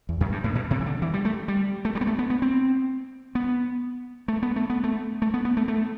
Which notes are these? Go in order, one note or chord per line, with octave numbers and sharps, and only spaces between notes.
E2
F#2
G2
A2
B2
C3
E3
D3
E3
G3
A3
G3
A3
G3
B3
A3
B3
B3
C4
B3
A3
B3
A3
B3
A3
A3
B3
B3
A3
A3